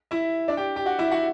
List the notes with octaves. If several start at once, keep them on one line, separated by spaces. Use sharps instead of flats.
E4 E5
D4 D5
G4 G5
G4 G5
F#4 F#5
E4 E5
F#4 F#5